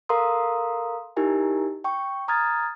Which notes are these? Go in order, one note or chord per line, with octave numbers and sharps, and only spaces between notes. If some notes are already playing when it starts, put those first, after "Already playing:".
A4 A#4 F5 A#5 C6 D#6
D#4 E4 G4 A#4 G#5
G5 C#6
A#5 D#6 F6 G#6 A6